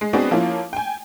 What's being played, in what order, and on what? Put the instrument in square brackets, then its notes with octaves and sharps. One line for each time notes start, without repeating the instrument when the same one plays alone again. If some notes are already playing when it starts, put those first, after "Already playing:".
[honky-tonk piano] G#3
G#3 B3 C4 D4 F#4 G#4
F3 A#3 C#4 E4 F4
G5 G#5